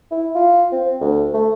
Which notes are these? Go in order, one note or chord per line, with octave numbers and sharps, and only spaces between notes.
E4
F4
C4
D2
A3